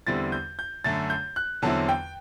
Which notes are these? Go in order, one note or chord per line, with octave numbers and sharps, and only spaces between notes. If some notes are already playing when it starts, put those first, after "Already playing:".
E2 D3 G3 C4 E4 A6
G6
G6
F#2 D3 A3 A6
G6
F#6
E2 D3 F#3 C4 E4 A5
G5